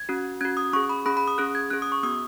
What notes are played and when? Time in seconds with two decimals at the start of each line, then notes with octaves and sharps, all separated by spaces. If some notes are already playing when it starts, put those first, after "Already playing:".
Already playing: G#6
0.09 C#4 F#4
0.41 C#4 F#4 G#6
0.57 D#6
0.73 C#4 G#4 C#6
0.89 B5
1.05 C#4 G#4 B5
1.17 B5
1.28 D#6
1.38 C#4 G#4 F#6
1.55 G#6
1.70 C#4 G#4 F#6
1.82 D#6
1.92 C#6
2.03 B3 F#4 D#6